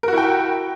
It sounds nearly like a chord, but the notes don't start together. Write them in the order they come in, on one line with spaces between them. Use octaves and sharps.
A#4 F#4 E4 G5